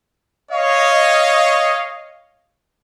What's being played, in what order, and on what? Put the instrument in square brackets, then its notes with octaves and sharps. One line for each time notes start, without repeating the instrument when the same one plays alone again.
[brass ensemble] C#5 D#5 F5